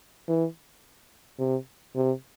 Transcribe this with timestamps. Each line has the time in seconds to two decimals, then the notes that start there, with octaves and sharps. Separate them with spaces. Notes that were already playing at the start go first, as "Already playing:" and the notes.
0.28 E3
1.39 C3
1.95 C3